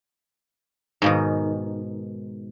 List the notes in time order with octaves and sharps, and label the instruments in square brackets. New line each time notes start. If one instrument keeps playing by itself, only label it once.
[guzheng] G#2 B2 D#3